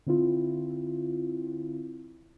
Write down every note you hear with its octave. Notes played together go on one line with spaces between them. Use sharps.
D3 C4 E4 F4